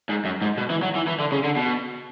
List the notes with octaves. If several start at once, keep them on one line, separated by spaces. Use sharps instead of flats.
G#2
F#2
G#2
B2
E3
F#3
E3
E3
D3
C#3
D3
B2